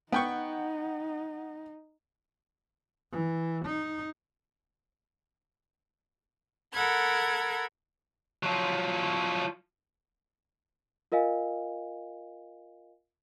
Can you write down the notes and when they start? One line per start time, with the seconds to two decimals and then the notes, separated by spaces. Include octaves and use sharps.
0.12 B3 D#4 F#5 G5 C#6
3.12 E3
3.64 D#4
6.72 A4 A#4 F#5 B5 G#6
8.43 F3 F#3
11.12 F4 A#4 D#5 F5 G#5